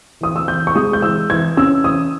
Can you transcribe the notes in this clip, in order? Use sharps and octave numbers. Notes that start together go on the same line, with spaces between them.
E3 D#6
E6
E3 G6
C#6
G#3 D#6
G6
E3 E6
E3 G#6
C#4 E6
E3 D#6